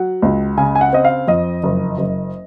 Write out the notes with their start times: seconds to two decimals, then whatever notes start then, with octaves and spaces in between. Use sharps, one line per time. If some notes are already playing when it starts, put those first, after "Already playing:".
Already playing: F#3 F#5
0.22 C#2
0.57 C#3 G#5
0.75 G#5
0.81 F#5
0.93 C4 D#5
1.05 F5
1.28 F2 D#5
1.63 F#1
1.98 F#1